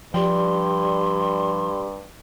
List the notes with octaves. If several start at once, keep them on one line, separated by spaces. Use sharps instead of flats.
G2 F3 G4 D5 G5 C6